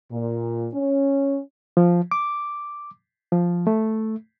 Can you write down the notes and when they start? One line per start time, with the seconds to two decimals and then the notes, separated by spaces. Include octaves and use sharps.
0.12 A#2
0.74 C#4
1.77 F3
2.11 D6
3.32 F3
3.67 A3